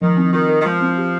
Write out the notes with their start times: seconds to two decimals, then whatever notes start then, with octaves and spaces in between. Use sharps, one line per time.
0.01 D#3 F3
0.17 C4
0.33 D#3 F4
0.49 A#4
0.60 D#3
0.64 F3 G#3
0.81 C4
0.97 G4